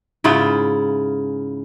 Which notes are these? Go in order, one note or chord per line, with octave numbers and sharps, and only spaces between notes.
G#2 C#3 E4 F4